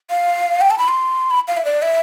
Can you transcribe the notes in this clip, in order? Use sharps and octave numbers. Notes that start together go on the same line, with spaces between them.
F5
G5
A5
B5
C6
B5
F5
E5
D5
E5